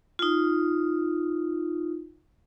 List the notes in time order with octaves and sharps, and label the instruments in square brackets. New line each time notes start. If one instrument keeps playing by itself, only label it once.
[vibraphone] D#4 F4